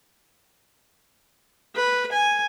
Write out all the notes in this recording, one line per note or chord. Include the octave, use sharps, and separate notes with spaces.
B4
G#5